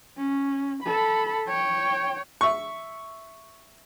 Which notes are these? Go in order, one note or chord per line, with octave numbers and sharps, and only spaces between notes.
C#4
A4 B5
C#5 G5
E5 C#6